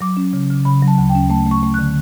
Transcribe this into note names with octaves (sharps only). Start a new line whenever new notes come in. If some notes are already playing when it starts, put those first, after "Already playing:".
F#3 D6
C#4
C#3
C#3
C#3 B5
F#3
A5
D2
G5
C#4
A3 A5
A3
C#6
A3
D3 F#6